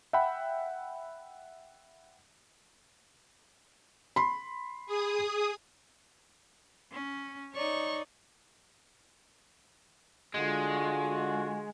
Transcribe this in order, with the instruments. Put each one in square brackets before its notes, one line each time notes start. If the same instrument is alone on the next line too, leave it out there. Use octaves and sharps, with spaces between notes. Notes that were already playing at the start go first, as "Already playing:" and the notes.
[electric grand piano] E5 F#5 G5 B5
[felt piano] B5 C6
[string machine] G#4 D#6
[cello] C#4
[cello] D#4 D5 [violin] C#5 C#6
[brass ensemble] D3 F4 F#4 [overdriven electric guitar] G#3